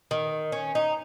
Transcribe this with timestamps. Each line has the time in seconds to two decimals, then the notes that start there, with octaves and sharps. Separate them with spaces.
0.11 D#3
0.52 C#4
0.75 D#4